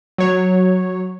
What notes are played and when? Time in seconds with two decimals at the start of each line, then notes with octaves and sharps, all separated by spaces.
0.18 F#3 C#5